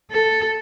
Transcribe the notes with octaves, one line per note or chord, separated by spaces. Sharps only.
A4